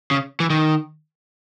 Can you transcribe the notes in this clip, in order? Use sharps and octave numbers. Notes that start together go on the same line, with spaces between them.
C#3
E3
D#3